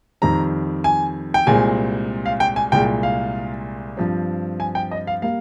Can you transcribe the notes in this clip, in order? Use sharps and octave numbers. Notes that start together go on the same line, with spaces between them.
F2 D#3 G3 C4 A#5
G#5
G5
C2 A#2 G#3 C4 G#5
F5
G5
G#5
C2 A#2 G#3 G5
F5
G2 F3 C4
G#5
G5
D#5
F5
G3 A#3 F5